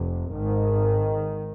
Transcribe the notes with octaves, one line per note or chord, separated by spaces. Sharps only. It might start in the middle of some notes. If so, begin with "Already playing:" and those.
Already playing: F1 F2 C3
G#1 G#2 D#3